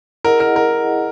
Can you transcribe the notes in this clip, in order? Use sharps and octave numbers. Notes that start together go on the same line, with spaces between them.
E4 G#4 A#4 D#5 F#5
A#4
A#4